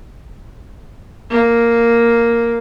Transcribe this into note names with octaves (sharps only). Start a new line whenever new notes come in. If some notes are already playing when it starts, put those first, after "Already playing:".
A#3